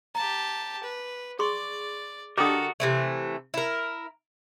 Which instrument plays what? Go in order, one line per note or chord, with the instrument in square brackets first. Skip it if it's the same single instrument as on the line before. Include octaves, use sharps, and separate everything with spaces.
[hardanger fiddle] G4 A5 [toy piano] A#5
[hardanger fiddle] B4
[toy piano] G#4 C6 C#6 [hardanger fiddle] D5
[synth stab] D3 G4 [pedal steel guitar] F#4 A#4 [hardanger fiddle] A4 [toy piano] D#5 D#6
[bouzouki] C3 E3 A3
E4 A#4